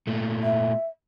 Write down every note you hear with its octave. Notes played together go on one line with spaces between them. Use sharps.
A#2 A3
E5